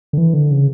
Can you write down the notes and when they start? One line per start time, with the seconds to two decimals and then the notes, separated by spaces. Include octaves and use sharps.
0.13 D3
0.17 E3
0.34 D3
0.51 C#3